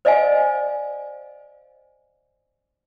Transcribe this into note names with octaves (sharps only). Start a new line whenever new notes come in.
C5 D5 D#5 F5 G#5